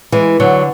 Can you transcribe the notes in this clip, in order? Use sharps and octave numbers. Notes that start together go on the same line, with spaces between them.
E3 G#3
D3 F#3